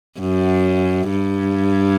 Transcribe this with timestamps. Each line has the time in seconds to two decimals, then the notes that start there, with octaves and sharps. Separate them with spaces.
0.20 F#2
1.10 G2